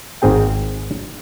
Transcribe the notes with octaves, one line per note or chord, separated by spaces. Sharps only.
G#1 G#2 C4 G#4 G5